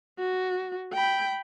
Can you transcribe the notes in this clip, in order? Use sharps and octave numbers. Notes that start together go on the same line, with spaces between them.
F#4
G5 B5